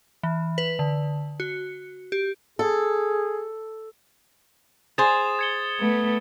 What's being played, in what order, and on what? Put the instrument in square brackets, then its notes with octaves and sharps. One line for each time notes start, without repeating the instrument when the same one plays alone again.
[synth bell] E3
B4
D3
F#4
G4
[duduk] G#4 [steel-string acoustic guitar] A4
[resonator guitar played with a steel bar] G#4 C5 [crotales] D#6 A6 E7
[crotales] G#6 C#7 G7
[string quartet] A3 B3